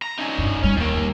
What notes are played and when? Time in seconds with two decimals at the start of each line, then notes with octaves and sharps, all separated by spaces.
0.02 A#5
0.19 C#4 D#4
0.38 G2 D4
0.63 G3 C#4
0.77 D#2 D#3 A#3